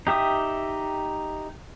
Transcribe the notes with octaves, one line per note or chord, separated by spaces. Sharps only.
D#4 G4 E5 D#6